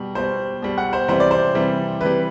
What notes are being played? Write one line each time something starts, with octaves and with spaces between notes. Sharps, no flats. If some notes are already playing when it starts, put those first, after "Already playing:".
Already playing: B2 G3
B2 G3 C5
B2 G3
F#5
C5
C3 E3 G3 C5
D5
C5
C3 E3 G3
C3 E3 G3 B4